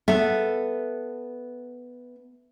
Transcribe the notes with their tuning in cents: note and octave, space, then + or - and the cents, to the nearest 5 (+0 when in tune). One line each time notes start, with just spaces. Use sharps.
B3 +0 A4 +0 E5 +0